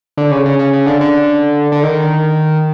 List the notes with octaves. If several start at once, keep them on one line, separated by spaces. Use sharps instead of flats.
D3
C#3
C#3
C#3
C#3
D3
D3
D3
D#3